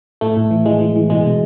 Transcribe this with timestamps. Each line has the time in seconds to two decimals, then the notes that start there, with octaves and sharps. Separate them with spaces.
0.21 A2 A3
0.37 A2
0.51 E3
0.66 E3 G#3
0.81 E3
0.96 E3
1.10 B2 G#3
1.26 B2